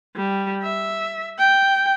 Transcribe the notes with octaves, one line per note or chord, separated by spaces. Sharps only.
G3
E5
G5